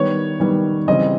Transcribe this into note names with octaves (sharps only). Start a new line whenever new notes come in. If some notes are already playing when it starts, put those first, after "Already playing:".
Already playing: D#3 G3 B3 C#5
D#3 G3 B3
C#3 E3 G3 C4 D#5